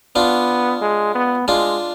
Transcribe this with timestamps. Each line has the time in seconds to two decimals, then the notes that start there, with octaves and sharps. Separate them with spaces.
0.15 B3 D4 F4
0.81 G#3
1.15 B3
1.47 G#3 D4 F4